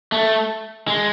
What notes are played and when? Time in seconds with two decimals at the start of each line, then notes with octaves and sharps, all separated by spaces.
0.12 A3
0.88 G#3